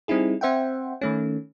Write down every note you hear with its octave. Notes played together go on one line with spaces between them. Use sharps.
G3 C4 D#4 E4 G#4
C4 C5 E5 F#5 G5
D#3 A3 C#4